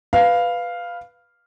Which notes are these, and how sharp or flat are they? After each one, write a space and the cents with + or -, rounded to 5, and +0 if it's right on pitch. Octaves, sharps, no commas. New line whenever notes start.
B4 +0 F5 +0